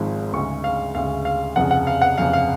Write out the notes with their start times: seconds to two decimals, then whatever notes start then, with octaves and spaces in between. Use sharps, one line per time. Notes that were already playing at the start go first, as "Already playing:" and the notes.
Already playing: G#1 G#2 F3 G#3
0.33 D2 C#3 G#3 C#6
0.64 F5
0.95 D2 C#3 G#3 F5
1.25 F5
1.56 F1 F2 C#3 F#5
1.71 F#5
1.87 F5
2.02 F#5
2.18 F1 F2 C#3 F5
2.33 F5